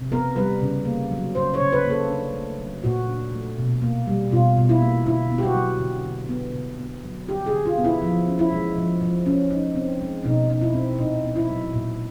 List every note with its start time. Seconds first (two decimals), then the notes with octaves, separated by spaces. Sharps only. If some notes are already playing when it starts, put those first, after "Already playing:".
Already playing: C3
0.12 B3 A#4
0.36 G3 B4
0.62 C#3
0.85 A#3
1.11 F#3
1.35 C#3 C5
1.54 C#5
1.60 C#3
1.72 B4
1.85 A#3
1.90 A4
2.10 D4
2.34 A3
2.58 F#3
2.84 A#2 F#4
3.08 D4
3.32 A3
3.58 B2
3.82 A#3
4.07 G3
4.31 B2 F4
4.57 B2
4.69 E4
4.81 A#3
5.05 D3 E4
5.30 B3
5.38 G4
5.43 F#4
5.55 F#3
5.79 D3
6.05 D3
6.29 B3
6.54 D3
6.79 B3
7.03 F#3
7.28 D3 G4
7.46 G#4
7.53 D3
7.66 F4
7.78 B3
7.84 E4
8.02 F3
8.28 C#4
8.39 E4
8.52 G#3
8.76 F3
9.01 F3
9.26 C#4
9.50 D#4
9.75 C4
10.01 G#3
10.24 B2 D#4
10.50 D#4
10.61 E4
10.73 C4
10.98 A#2 D#4
11.23 B3
11.36 E4
11.49 F#3
11.73 A#2